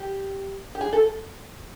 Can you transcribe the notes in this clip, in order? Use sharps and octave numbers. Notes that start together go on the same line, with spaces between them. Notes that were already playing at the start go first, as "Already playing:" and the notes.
Already playing: G4
G4
G#4
A4